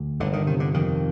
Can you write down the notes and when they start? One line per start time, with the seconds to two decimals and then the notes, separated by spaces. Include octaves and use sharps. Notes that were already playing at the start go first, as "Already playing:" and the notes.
Already playing: D2
0.20 G1 D3
0.33 D#3
0.47 C3 D#3
0.60 D3
0.74 F2 D#3